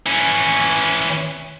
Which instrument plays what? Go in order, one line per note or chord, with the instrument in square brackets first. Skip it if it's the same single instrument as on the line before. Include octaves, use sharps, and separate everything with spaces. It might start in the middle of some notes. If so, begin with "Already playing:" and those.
[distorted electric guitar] E3 C#4